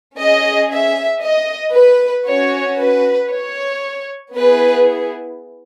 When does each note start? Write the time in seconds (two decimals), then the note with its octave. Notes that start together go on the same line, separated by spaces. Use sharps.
0.19 C#4 G#4 D#5
0.72 E5
1.23 D#5
1.75 B4
2.27 C#4 F#4 C#5
2.79 B4
3.32 C#5
4.36 B3 E4 G#4 B4